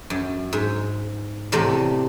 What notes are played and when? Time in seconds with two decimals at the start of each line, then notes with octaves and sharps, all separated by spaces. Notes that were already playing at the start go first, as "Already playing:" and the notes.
0.10 F#2
0.53 G#2
1.52 E2 A2 C3 D5 A#5